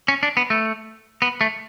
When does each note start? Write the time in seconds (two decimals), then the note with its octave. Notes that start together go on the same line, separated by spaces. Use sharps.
0.08 C#4
0.23 D4
0.37 B3
0.50 A3
1.22 B3
1.41 A3